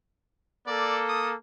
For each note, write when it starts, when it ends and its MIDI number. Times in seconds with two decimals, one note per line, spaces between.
0.67 1.34 58
0.67 1.34 69
0.67 1.01 74
1.09 1.30 87